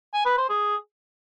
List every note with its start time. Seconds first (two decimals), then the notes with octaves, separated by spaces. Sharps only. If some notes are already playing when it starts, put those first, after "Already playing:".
0.14 G#5
0.26 B4
0.38 C5
0.50 G#4